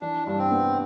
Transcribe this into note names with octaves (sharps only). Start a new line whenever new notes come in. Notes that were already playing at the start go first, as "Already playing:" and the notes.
E3 D4
G2 D4
C4
B3